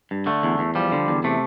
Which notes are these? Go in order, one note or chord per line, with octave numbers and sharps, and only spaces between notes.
G2
D3 A3
E2
E2
F3 G3
D3
E2
C3 A3